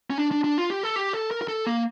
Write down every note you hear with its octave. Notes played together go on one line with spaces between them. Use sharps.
C#4
D4
D4
D4
F4
G4
A4
G4
A4
A#4
A#4
A4
A#3